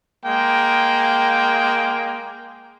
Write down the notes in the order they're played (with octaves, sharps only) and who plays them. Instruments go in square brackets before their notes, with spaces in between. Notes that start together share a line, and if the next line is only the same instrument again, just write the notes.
[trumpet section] G#3 A#3 G5